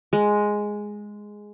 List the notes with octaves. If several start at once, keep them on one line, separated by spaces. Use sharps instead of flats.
G#3